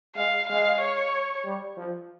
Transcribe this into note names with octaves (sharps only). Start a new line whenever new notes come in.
G#3 F5
G#3 F5
C#5
G3
F3